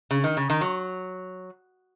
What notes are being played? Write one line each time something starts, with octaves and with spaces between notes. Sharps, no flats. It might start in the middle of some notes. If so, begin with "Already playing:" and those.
C#3
D#3
C#3
D#3
F#3